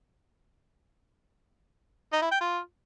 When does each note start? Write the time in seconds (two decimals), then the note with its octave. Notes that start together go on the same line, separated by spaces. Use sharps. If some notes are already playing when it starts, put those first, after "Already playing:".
2.12 D#4
2.22 E4
2.31 G5
2.41 F4